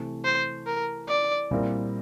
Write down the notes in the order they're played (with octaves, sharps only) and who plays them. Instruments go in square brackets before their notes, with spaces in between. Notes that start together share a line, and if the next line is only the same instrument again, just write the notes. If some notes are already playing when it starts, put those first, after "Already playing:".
Already playing: [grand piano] C3 E3 A3
[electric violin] C5
A#4
D5
[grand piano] A#2 G3 C4 E4 A#4